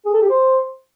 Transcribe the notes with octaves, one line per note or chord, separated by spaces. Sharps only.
G#4
A4
G4
C5